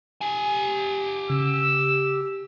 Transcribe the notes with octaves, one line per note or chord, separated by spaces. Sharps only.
G4 G#5
C#3 E6